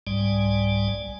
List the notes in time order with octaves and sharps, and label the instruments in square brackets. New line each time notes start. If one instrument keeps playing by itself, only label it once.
[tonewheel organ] C2 G#2 G3 D5 G#5